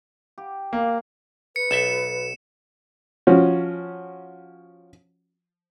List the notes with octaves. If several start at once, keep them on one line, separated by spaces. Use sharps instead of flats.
G4
A#3 F5 A#5
B4 C#7
B1 A4 E5 E7
F3 C#4 F#4